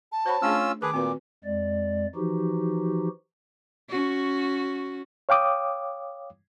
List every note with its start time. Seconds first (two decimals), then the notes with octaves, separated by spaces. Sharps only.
0.12 A5
0.26 F#4 C5 C#5 B5
0.42 A3 C#4 D4 F4 G#4 E6
0.82 D#3 G#4 A#4 B4 A5 D6
0.94 A#2 C4 F#4 B4
1.45 F2 G#3 D5
2.16 E3 F3 D#4 F#4 G4
3.90 C#4 F#4
5.29 C#5 F5 G5 D6 D#6